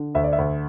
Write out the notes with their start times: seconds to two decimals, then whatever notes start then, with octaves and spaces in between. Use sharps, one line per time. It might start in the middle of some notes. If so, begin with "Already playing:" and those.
Already playing: D3
0.15 D2 E5
0.24 D5
0.33 E5
0.38 D2